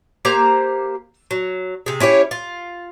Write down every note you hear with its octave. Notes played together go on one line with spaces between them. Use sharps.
A#3 G4 C5 A#5
F#3
C3 G#4
C#4 E4 G4 C#5
F4